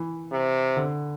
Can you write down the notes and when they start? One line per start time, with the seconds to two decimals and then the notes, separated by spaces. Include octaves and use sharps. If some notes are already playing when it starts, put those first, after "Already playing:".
Already playing: E3
0.32 C3
0.76 D3